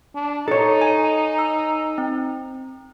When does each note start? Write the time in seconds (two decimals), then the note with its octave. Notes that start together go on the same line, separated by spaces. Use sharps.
0.15 D4
0.48 D#4 A4 C#5
0.81 G#5
1.39 E6
1.98 C4